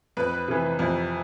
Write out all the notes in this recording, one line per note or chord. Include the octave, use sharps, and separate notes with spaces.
F2 B4
C3 E3
F2